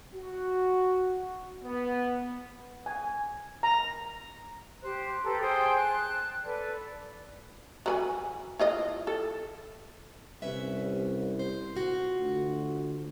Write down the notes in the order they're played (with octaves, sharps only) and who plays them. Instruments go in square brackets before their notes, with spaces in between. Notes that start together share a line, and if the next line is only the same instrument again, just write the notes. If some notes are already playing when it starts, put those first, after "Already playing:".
[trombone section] F#4
B3
[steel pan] G#5
A#5
[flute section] G4 C5 F#6
G4 A4 B4 A#5
G#4 C5 G5 G#5
A5 F#6
A4 B4 D5
[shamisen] F#3 B4 G#5
E4 F4 D#5
A4
[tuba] C2 [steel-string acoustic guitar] C#4 B4 E5
[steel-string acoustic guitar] C5
F4 F#4
[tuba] D2